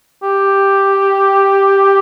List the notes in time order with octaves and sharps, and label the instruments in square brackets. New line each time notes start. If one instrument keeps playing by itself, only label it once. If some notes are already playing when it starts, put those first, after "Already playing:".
[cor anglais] G4